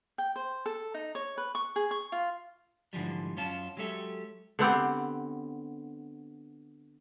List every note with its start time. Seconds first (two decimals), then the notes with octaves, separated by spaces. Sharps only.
0.18 G5
0.36 C5
0.66 A4
0.94 D#4
1.15 C#5
1.38 B4
1.55 C#6
1.76 G#4
1.91 C#6
2.12 F4
2.93 G#2 D3 E3 F3 G3
3.37 F#2 C#4 F4 A5
3.77 F#3 G#3 G4 A4 E5
4.59 D3 B3 C4 G4